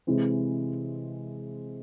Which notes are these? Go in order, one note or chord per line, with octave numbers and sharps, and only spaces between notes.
C3 E3 G#3 C4